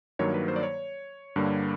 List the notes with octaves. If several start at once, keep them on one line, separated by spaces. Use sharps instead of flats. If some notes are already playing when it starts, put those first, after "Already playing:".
G2 D#3 F#3 A#3 C#5
B4
C5
D5
C#5
G2 D3 G3 A#3